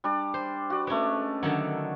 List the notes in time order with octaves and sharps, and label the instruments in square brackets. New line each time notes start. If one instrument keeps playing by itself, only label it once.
[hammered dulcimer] G3 D4 D5
[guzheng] C5
[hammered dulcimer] F#4 D5
[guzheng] G#3 C#4 [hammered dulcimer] A3 B4
[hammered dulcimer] A5
[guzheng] D3 D#3 F#3